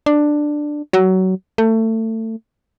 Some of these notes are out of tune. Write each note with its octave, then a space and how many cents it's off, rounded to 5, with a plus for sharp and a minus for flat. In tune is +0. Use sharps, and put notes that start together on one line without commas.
D4 +10
F#3 +20
A3 +25